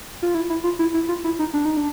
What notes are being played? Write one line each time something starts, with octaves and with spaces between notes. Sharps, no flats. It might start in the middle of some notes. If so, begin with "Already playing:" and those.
F4
E4
E4
F4
E4
E4
F4
E4
D#4
D4
D#4
D4